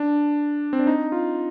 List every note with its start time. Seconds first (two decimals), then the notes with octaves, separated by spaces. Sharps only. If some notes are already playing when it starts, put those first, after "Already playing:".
Already playing: D4
0.73 C4
0.79 D4
0.87 D#4
1.12 F4